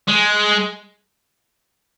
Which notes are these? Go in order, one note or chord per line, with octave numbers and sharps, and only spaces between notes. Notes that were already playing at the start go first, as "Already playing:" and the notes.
G#3